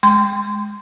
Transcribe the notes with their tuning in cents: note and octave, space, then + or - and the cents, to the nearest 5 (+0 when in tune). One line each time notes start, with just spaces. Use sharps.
G#3 +0 C6 -25